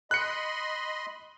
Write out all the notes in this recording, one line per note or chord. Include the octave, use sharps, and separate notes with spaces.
D#5 B5 C6 F#6 C#7